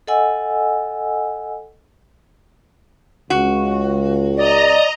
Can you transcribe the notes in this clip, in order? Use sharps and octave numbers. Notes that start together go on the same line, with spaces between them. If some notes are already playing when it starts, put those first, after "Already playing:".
A4 D#5 F#5 G#5 E6
C#2 F#4
D5 D#5 A#5